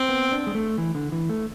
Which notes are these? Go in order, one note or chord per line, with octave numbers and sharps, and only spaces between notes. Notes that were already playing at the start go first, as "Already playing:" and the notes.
Already playing: C4
B3
D4
G#3
A3
E3
D3
E3
A3